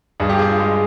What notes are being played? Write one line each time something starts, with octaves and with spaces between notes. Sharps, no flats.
G2 G#4
G4
F4 G#4
G#3